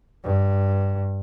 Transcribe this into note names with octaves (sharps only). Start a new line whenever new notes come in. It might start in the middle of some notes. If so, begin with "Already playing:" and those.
G2